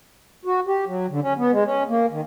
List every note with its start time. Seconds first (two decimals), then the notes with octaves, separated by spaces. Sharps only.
0.45 F#4
0.67 G4
0.86 F#3
1.10 D3
1.22 C#4
1.37 B3
1.52 G#3
1.65 C#4
1.88 A#3
2.11 D#3